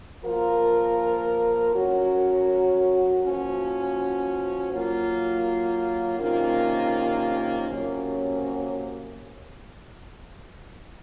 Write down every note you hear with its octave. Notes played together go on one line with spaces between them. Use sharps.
F3 A#3 F4 A#4
F#3 C#4 F#4 A#4
F3 A#3 C#4 F#4
F#3 A#3 F4
C3 D#3 A#3 C#4 F4
C3 F#3 A#3 C#4